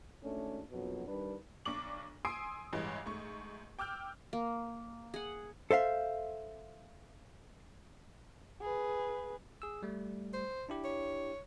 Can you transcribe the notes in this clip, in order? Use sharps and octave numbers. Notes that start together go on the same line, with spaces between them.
G#1 A3 C#4 D4
A#1 F2 B2 F#3
D#3 G3 D4 B4
B1 D4 C#6 D6 F#7
G#5 C6 D#6 E6 C7 D7
A1 G2 E3 G#3
G#2 A3 C#6
G5 D6 E6 F6 G6
A#3
G#4 F#5
A4 C5 E5 F5
G#4 B4
G#4 E6
G3 A3
C5
D4 E4 G4
C#5